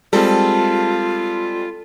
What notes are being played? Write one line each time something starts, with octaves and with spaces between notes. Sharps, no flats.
G3 G#3 C4 F4 A4